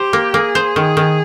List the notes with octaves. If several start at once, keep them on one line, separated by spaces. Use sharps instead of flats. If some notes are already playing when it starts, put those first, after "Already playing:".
Already playing: G4 C5
A#3
A#3 G#4
C5
D#3
D#3